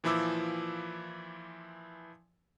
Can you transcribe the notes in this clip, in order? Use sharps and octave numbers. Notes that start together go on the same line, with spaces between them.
A#2 E3 F3 E4 D6 E6